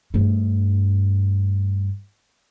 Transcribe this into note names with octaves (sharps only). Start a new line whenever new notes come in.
G2 A3